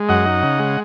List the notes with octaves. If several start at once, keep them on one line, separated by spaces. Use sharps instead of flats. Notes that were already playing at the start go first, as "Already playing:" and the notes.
Already playing: G#3
F#2 D#5 F#5
D#4
C#3
G#3